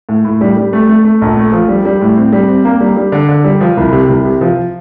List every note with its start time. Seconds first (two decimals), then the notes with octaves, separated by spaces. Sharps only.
0.09 A2
0.25 A2
0.41 G3
0.57 G3
0.73 A3
0.89 A3
1.05 A3
1.22 A#1
1.37 A3
1.52 F3
1.69 G3
1.85 G3
2.01 A2
2.17 C4
2.33 G3
2.49 C4
2.65 A#3
2.81 G3
2.97 G3
3.12 D3
3.29 D3
3.44 G3
3.61 F3
3.77 C2
3.93 C3
4.09 C2
4.25 C3
4.41 F3